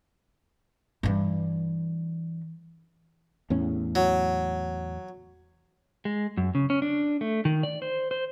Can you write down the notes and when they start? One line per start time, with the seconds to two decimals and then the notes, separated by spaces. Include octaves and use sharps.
1.03 G2 E3
3.50 E2 A2 C#4
3.95 F#3
6.05 G#3
6.37 F#2
6.55 C#3
6.70 C#4
6.82 D4
7.21 A3
7.45 D#3
7.63 D5
7.82 C5
8.11 C5